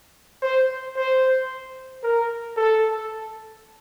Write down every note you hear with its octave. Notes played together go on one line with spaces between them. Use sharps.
C5
C5
A#4
A4